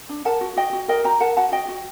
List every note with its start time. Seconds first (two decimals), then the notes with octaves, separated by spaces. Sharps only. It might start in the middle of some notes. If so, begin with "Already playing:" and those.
0.09 D4
0.25 A#4 F#5 A5
0.41 F#4
0.57 F#4 D#5 G5
0.73 F#4
0.88 A#4 D#5 G5
1.04 F#4 G5 A#5
1.21 A#4 F#5 A5
1.37 F#4 F#5 A5
1.52 F#4 D#5 G5
1.68 F#4